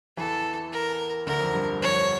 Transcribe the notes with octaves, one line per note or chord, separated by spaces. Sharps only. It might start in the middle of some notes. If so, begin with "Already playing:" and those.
E2 E3 A4
A#4
D2 D3 A#4
F2
G2
F2 C#5